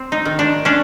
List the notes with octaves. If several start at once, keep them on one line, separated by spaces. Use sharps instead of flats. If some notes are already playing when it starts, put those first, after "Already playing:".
Already playing: C4
D#4
D#3
D4
C#4 D4